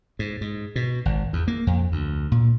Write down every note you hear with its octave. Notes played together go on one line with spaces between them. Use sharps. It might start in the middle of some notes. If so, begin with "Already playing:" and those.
G#2
G#2
B2
G#1
E2
A#3
F2
D2
A#2